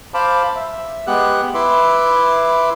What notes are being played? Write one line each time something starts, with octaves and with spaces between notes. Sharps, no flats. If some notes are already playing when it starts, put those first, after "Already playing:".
C5 F5 A5 B5 D6
E5
G#3 B3 G4 F#5 F#6
E4 B4 E5 C6 D6